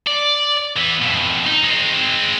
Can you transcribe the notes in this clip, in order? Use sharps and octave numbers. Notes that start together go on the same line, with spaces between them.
D5
E3 B3
F2 B2
D#4
G#3 C4